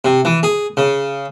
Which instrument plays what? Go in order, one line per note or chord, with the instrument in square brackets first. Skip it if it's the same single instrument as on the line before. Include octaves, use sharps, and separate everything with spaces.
[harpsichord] C3
E3
G#4
C#3